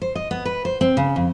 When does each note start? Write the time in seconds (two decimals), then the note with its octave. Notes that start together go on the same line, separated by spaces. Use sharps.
0.02 C5
0.15 D#5
0.31 B3
0.45 B4
0.65 C5
0.81 C4
0.97 C#3
1.16 F2